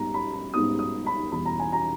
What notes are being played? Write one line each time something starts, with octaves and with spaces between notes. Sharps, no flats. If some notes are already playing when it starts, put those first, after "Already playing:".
Already playing: G#2 G3 B3 D#4 A#5
B5
B5
G#2 G3 B3 D#4 D#6
D#6
B5
E2 B2 G3 B5
A#5
G#5
A#5